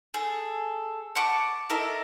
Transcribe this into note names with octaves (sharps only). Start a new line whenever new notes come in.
G#4 A4
F#5 A5 C#6 D6
E4 A4 A#4 D#5